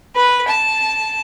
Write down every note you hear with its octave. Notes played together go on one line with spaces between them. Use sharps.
B4
A5